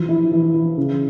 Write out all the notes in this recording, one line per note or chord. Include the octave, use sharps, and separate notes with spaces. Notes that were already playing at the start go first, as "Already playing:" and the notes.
Already playing: E3 F3
E4
E3
E3
C#3